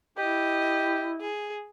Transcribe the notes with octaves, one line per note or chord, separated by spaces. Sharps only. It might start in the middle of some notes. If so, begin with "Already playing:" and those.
E4 G4 D#5
G#4